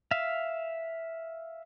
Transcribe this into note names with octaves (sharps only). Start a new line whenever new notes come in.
E5 F5